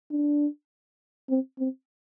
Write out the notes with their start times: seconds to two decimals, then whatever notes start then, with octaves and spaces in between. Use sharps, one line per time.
0.11 D4
1.29 C4
1.59 C4